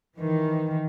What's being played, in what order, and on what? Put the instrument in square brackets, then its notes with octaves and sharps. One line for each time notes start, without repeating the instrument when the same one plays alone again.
[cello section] D#3 E3